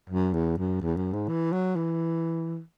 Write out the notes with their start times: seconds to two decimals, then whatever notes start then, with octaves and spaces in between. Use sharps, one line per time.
0.09 F#2
0.33 E2
0.58 F#2
0.81 E2
0.96 F#2
1.13 G#2
1.28 E3
1.52 F#3
1.76 E3